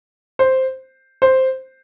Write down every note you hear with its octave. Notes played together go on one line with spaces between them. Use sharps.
C5
C5